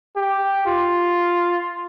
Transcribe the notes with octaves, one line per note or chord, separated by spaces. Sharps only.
G4
F4